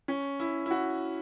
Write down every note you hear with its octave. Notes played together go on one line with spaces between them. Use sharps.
C#4
E4
E4
F#4